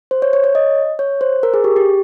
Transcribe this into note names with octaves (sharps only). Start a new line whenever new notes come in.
C5
C#5
C#5
C#5
D#5
C#5
C5
A#4
G#4
G4
G4